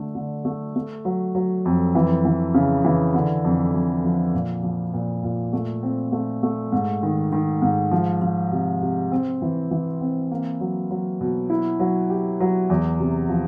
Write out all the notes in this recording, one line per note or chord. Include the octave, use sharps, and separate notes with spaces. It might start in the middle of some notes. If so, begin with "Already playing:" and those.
Already playing: D3 A3
D3
A3
A3
F#3
F#3
F2
E3
E3
C#3
E3
D3
F2
F2
F3
A#2
F3
A#2
A#2
A3
C4
A3
A3
G#2
D#3
D#3
G#2
F3
F3
C3
C3
C4
E3
E3
C4
A#3
F#3
F#3
B2
E4
F#3
G4
F#3
E2
C3
F3